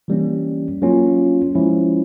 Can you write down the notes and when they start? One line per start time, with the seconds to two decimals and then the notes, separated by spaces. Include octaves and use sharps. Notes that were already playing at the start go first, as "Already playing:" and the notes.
0.08 E3 G3 A#3 C#4
0.82 F#3 A#3 C#4 F4
1.55 F3 G#3 C#4 E4